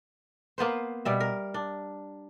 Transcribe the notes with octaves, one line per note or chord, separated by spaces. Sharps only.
A#3 B3 B4 C5
B2 G3 E5
A#4
D4